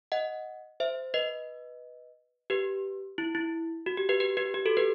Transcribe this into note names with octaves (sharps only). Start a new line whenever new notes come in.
D#5 F#5
C5 E5
B4 D#5
G4 B4
E4
E4
F#4
G4
G4 B4
G4 B4
G4 B4
G4
F#4 A4
G4 B4